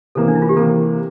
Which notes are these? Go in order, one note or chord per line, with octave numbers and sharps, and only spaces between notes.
C3 E3 A#3 A4
D4
E4
F4
G4
C3 E3 A#3 A4